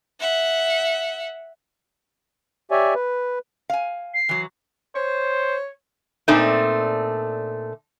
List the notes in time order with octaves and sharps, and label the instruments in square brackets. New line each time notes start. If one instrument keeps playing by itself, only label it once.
[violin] E5 F#5
[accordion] G4 C#5 D5 E5 G#5
B4
[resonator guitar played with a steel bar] F5 G#5
[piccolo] C7
[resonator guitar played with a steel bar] E3 F#3
[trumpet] C5 [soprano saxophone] C#5
[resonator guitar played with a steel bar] A#2 A3 C4 D4 D#4